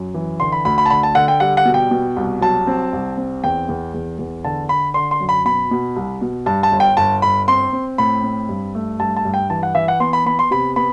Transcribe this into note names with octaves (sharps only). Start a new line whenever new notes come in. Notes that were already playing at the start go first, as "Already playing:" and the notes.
Already playing: F#2
E3
D3 C6
B5
D2 B5
B5
A5
D3 B5
A5
D3 F#5
G5
G3 F#5
F#5
B2
G5
B2
C2
F#3 A5
C4
C2
C4
E2 G5
E2
E2
E2
D3 A5
D3 B5
D3 C6
C6
F#2
B5
B2 B5
B2
C2
B2
G2 A5
A5
G1
G5
G1 A5
G1 B5
C4 C6
C4
A2 B5
C4
G2
A3
G2 A5
A5
G2
G5
E3 A5
F#5
E3 E5
F#5
B3 C6
B5
B3 B5
C6
C3 B5
B3 B5